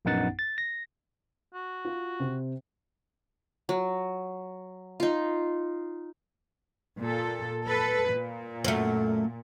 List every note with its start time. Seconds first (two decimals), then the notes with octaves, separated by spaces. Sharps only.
0.05 A#1 F#2 B3 D#4 F#5 A6
0.39 A6
0.58 A#6
1.54 F#4
1.85 F4
2.20 C3 C4
3.69 F#3
5.00 D#4 F4
6.98 A#2 A4
7.66 A4 B4
8.11 A#2
8.64 F#2 A3